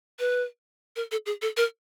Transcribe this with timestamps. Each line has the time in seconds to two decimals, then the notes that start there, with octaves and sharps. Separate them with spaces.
0.19 B4
0.96 A#4
1.12 A4
1.26 G#4
1.42 A4
1.57 A#4